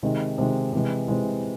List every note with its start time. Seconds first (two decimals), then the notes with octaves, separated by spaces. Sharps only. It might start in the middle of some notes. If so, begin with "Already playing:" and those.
0.03 C3 D#3 G#3
0.38 C3 D#3 G#3
0.73 C3 E3 G#3
1.08 C3 E3 G#3